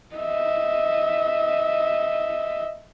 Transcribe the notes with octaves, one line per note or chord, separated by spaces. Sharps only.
D#5 E5